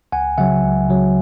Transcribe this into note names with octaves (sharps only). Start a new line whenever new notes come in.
C#2 F#5 G#5
C#3 F#3 E5 F#5
C#2
C#3 F#3